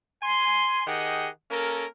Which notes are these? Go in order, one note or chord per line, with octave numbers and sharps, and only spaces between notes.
G#5 C6
D#3 G4 G#4 D#5 F#5
A#3 C#4 A4 A#4